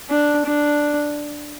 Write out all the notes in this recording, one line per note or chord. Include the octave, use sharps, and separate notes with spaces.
D4
D4